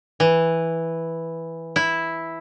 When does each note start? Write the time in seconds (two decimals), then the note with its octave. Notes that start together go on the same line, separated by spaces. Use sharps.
0.20 E3
1.76 E4